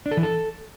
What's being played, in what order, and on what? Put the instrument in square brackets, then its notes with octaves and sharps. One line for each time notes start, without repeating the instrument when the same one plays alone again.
[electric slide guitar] D4
A4
E3
A4